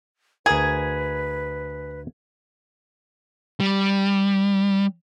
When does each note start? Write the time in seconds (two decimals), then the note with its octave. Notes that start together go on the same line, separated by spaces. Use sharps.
0.46 D2 G#4 A#4 B4 G#6
3.60 G3